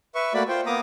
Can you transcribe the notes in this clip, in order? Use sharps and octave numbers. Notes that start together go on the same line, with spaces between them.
B4 E5 C#6
A3 A#3 F#4 D5 B5
F4 C5 G5
A#3 B3 A#5 D6 D#6